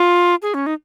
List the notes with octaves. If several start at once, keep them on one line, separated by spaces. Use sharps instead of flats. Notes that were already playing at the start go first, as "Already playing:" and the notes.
Already playing: F4
G#4
C#4
D#4